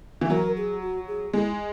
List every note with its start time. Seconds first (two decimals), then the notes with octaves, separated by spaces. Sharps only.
0.21 E3
0.30 F#3 A#4
0.57 G#4
0.82 F#4
1.07 G#4
1.33 G#3 E4